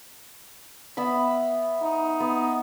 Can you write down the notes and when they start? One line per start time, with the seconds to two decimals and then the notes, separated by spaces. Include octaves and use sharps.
0.97 B3 E5 B5
1.83 D#4
2.20 B3